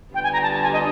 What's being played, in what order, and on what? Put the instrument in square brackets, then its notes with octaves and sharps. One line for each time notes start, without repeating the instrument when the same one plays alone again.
[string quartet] D3 G3 B3 D4 F4 [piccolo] G5
[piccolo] G#5
A#5
A5
A5
G#5
D#5